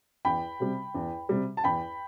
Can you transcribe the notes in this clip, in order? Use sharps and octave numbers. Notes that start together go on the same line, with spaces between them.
E2 G5 B5
C3 G3
E2
C3 G3
A5
E2 G5 B5